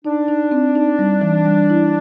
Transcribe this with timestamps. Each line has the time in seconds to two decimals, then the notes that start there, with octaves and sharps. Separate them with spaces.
0.05 D4 D#4
0.29 D#4
0.51 C4
0.75 D#4
0.99 G3
1.21 E3
1.46 G3
1.70 E4